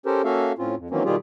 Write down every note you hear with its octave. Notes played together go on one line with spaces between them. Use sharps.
C#4 G4 A4 A#4 C5
A#3 C#4 F#4 A4 E5 F5
A2 C4 C#4 F4
F2
D#3 E3 F#3 A#3 C4 C#4
B2 D#3 G3 F4 G4 G#4